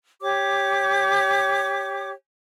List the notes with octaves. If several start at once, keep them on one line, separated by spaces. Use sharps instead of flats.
G4 C#5 D6